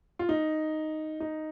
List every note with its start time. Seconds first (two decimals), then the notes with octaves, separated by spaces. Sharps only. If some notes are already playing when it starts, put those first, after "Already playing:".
0.19 F4
0.29 D#4
1.20 D#4